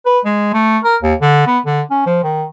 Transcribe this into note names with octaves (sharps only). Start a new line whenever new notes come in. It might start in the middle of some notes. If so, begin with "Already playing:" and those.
B4
G#3
A3
A#4
D#2
D3
B3
D3
C#4
F3
D#3